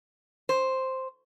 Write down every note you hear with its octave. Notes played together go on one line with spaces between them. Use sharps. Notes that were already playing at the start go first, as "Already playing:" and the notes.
C5